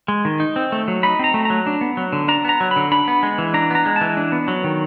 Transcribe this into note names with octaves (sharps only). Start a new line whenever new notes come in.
G#3
D#3
D#4
C4
A3
F#3
D#4 B5
C4 A#5
A3
F#3 A#5
D4
B3
F#3
D3
D4 A#5
B3 A#5
F#3
B5
D3
D4 B5
B3
G#3
E3
D4 A#5
B3 A#5
G#3
A5
E3
D4
B3
F#3
D#3